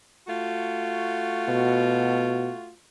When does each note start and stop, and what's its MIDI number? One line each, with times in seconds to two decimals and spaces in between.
0.27 2.72 57
0.27 2.72 65
0.27 2.72 66
1.48 2.50 47